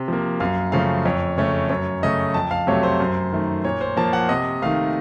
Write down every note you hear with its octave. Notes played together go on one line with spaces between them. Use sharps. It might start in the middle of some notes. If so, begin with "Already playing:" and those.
Already playing: C3
F3 A#3
F#2 F5
C#3 F3 A3 F5
F2 C#5
C#3 A3 C#5
F#2 C#5
C#3 A3 D#5
F2 A5
F5
C3 F#3 A3 C#5
C5
F#2
D#3 A3
A#2 C#5
C5
F3 A#3 A5
F#5
C3 D#5
D#3 A3 F5